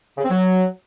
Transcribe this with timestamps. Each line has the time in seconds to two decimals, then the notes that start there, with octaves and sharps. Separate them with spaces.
0.18 C#3
0.24 C4
0.30 F#3